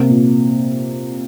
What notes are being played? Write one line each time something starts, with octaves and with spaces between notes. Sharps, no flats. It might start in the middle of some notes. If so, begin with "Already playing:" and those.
Already playing: C3 A#3
A#2